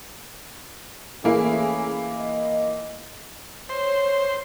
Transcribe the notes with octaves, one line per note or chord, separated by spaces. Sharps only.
E3 A3 A#3 C#4 E4 G#4
D#5
C5 C#5